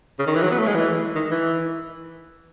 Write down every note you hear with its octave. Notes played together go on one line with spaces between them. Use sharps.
C#3
D#3
E3
F#3
B3
A3
G#3
E3
D#3
E3